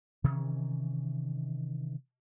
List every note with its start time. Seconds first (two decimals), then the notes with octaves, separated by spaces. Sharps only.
0.24 C3 D#3 E3 C#4